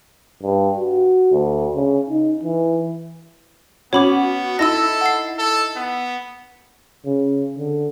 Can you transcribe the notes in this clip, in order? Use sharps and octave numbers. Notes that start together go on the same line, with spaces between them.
G2
F#4
D2
C#3
D#4
E3
B3 C#4 F#4 C#5 B5 D6
D#4 E4 A4 E6 A#6
F#5 C7
A4
B3
C#3
D3